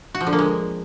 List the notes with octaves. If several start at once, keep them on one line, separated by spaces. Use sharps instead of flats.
F#4
F3
D3
A#3
G#3